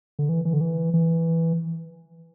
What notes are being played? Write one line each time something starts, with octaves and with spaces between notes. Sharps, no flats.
D3
E3
E3
D3
E3
E3